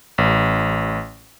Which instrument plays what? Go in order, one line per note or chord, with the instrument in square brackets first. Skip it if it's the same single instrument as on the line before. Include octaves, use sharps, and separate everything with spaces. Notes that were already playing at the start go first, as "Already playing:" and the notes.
[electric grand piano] A1